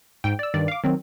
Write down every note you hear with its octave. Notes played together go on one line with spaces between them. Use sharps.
G#2 G5
D5 E6
G2 D#3 D5
F5 D6
D#3 F#3 C4